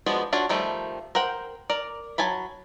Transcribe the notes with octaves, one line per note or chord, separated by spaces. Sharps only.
F3 G#3 B3 D4 F#4
D4 F4 F#4 C#5
D#3 F3 G3 A3
A#4 C5 F#5 G5
A#4 D5
F#3 G#5 A5 B5